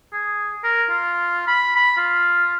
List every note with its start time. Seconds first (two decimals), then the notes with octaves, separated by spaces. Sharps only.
0.13 G#4
0.64 A#4
0.90 F4
1.48 B5
1.76 B5
1.97 F4